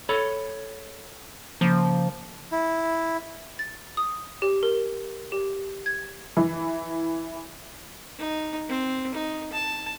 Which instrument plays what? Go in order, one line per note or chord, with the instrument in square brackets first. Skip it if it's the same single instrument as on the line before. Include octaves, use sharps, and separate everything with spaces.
[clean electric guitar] A4 C#5 B5
[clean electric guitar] C#3 A#3 [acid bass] F3
[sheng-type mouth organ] E4
[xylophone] A6
D#6
G4
A#4
G4
G#6
[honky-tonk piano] E3
[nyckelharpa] D#4
C4
D#4
A5